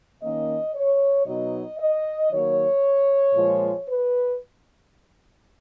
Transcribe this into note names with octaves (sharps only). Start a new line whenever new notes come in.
D#3 A#3 C#4 D#5
C#5
B2 F#3 B3 D#4 D#5
D#5
D#3 F#3 A#3 C#5
A#2 F3 G#3
B4